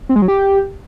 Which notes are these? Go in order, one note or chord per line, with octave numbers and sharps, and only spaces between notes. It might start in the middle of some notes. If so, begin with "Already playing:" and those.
C4
G#3
F#3
G4